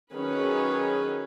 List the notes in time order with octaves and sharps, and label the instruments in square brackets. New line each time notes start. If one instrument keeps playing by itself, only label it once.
[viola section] D#3 F#3 C#4 G#4 B4